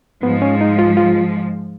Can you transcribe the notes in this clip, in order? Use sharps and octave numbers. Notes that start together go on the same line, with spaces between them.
G#2 F3 G#3 B3
C#4
D#4
F4
F4